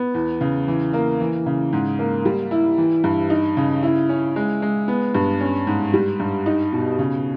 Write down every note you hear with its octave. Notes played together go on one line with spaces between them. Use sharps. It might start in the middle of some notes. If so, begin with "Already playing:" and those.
Already playing: B3
E2
C#3
E3
A#3
E3
C#3
G#2
A#3
G3
E4
E3
G2
D#4
C#3
E4
C#4
G#3
G#3
B3
G2
C#4
G#2
G3
G2
D#4
B2
C#3